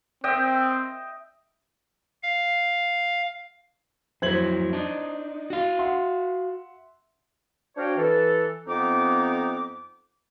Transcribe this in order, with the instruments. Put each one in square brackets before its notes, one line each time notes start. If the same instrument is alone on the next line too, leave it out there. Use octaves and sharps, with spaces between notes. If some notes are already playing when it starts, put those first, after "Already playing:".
[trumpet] C4 [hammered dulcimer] D#5 E5 G5
[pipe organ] F5
[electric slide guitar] F2 F#3 E4 [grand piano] C5 G#6 F#7
[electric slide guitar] D4 D#4
F#4 F5
[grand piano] E5 F#5 C6
[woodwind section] D4 F#4 C5 C#5 F5 G5
E3 A4
F2 B3 C4 D#4 D6